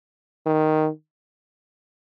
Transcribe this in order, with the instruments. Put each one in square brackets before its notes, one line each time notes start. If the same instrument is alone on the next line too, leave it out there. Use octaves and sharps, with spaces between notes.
[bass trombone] D#3